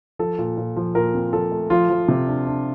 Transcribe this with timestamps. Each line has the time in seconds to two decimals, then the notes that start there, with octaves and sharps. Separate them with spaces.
0.19 F3 A4
0.38 A#2
0.58 A#2
0.76 F3
0.95 A#2 A#4
1.14 C4
1.33 F3 A4
1.52 A3
1.70 F3 F4
1.90 F3
2.08 C3
2.27 D4
2.47 D4